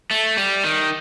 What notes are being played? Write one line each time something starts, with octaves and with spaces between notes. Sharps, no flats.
A3
G3
D#3